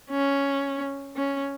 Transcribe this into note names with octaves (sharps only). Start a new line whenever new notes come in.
C#4
C#4